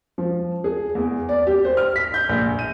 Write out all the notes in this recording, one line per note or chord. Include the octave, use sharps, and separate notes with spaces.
F3
G#4
E2
D5
G4
C5
F6
B6
G6
A#1
D#7